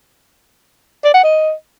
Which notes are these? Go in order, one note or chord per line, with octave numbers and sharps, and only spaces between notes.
D5
F#5
D#5